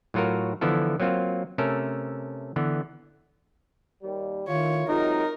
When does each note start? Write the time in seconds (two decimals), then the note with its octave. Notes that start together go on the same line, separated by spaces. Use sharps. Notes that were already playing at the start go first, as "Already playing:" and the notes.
0.14 A2 F#3 F4 F#4 A#4
0.61 D3 E3 F3 B3 E4 A4
1.00 F#3 A#3 C4 F4
1.58 C3 A3 C#4 A4 A#4
2.56 D3 E3 B3
4.03 D#2 G3
4.48 A2 D#3 E4 F4 C#5
4.88 C3 F#3 G#3 D#4 F4 A#4